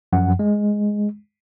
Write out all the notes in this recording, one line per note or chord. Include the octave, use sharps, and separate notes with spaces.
F#2 F3 F#5
G#3